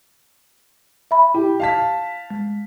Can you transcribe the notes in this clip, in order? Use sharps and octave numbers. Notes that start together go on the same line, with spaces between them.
E5 B5
E4 G4
F5 A5 B6
G#3